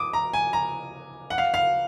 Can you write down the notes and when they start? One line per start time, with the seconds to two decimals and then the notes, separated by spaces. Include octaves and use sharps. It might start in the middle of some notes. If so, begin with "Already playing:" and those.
Already playing: D6 D#6
0.13 A#5
0.33 G#5
0.53 A#5
1.30 F#5
1.38 F5
1.54 F5